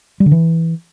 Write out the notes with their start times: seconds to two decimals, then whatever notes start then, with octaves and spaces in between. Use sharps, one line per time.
0.20 G3
0.26 D3
0.32 E3